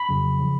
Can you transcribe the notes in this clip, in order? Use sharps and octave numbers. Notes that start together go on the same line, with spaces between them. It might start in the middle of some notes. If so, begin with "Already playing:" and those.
Already playing: B5
F2 C#3 F#3
C#3 F3